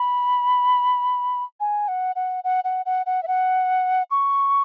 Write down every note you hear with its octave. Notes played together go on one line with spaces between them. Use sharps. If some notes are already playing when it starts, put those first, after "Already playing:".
Already playing: B5
G#5
F#5
F#5
F#5
F#5
F#5
F#5
E5
F#5
C#6